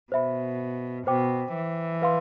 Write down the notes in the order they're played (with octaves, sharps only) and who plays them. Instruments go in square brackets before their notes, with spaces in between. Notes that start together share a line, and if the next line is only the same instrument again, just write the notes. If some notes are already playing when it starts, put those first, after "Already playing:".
[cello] B2 [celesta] C5 E5 B5
[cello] B2 [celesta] C5 G5 D6
[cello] E3
[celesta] B4 F5 C6